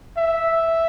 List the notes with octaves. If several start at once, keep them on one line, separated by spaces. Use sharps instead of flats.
E5